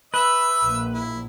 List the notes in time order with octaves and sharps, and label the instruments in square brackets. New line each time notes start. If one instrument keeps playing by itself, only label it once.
[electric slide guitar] B4 [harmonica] E5 E6
[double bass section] A#1
[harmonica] E4